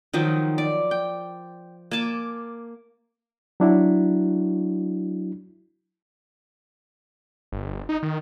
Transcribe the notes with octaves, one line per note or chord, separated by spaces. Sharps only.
D#3 F3 F#3 D#4
D5
G5
A#3 G#5 A5 D6
F#3 D4 E4 F#4
G1
D#4
D#3